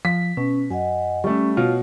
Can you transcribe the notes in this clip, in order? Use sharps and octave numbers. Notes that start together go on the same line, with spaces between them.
F3 B6
B2 C#4
F#2 D#5 F#5 G#5
G3 A3 C#4 C#6
B2 F4 C#5